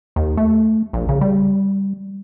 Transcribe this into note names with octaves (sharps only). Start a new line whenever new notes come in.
D#2
A3
A#1
C#3
G3